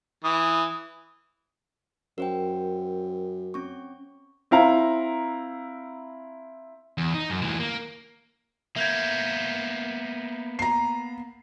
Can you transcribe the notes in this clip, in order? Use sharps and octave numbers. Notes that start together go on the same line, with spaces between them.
E3 D#6
F#2 A#4 C5 G5
C4 C#4 C#6
C4 E4 F5 A#5
E2
D#4
F#2
D2 E3
A#3
A#3 B3 E5 G6 G#6
A#5 C7